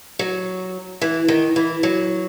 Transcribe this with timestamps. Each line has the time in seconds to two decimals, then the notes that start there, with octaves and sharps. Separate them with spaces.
0.19 F#3
1.01 E3
1.28 D#3
1.56 E3
1.83 F#3